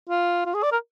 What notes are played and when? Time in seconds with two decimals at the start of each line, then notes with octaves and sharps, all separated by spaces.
0.10 F4
0.45 F4
0.54 G#4
0.63 D5
0.72 A#4